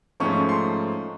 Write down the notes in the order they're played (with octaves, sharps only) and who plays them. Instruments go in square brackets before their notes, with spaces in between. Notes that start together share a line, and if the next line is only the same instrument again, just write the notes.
[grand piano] G#2 F3 A3 C#4 C#6
C6